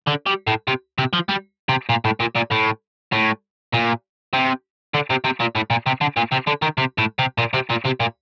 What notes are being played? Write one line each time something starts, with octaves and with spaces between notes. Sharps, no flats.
D3
G3
A2
C3
C3
F3
G3
C3
A#2
A2
A#2
A#2
A2
A2
A#2
C3
D3
C3
C3
A#2
A2
A#2
C3
D3
A#2
C3
D3
D#3
C3
A2
C3
A#2
C3
A#2
C3
A#2